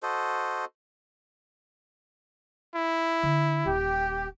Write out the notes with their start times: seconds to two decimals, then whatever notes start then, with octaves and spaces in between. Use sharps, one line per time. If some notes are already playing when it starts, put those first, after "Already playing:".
0.03 F#4 A4 C5 D#5
2.75 E4
3.23 D3
3.66 D#1 G4